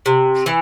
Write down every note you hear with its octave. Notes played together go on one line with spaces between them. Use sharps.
C3
E3